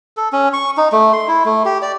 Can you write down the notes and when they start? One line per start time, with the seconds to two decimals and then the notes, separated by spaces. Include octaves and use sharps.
0.17 A4
0.33 C#4
0.53 C#6
0.77 D#4
0.92 A3
1.13 C6
1.28 E4
1.45 A3
1.65 G4
1.82 D5